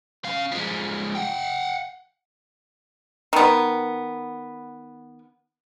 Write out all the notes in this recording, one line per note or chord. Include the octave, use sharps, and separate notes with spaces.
C#4 F5
F3 G#3
F#5 G5
D#3 B3